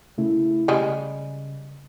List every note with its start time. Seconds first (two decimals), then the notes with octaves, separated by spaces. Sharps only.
0.18 C#3 A3 E4
0.68 C#3 G3 G#3